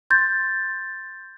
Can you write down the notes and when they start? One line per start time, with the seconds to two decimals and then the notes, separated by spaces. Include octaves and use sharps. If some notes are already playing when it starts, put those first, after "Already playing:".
0.10 C6 G6 A6